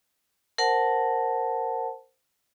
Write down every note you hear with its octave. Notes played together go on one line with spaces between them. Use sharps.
A#4 C5 F#5 A5